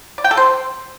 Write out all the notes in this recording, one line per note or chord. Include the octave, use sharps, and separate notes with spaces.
D5
G5
A4
C5